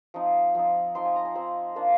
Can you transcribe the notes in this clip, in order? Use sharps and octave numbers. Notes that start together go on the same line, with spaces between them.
F3 C4 D#4
F3 C4 D#4
F3 C4 D#4 C6
G#5
A#5
G#5
F3 C4 D#4 C5
A#3 D4 F4 C5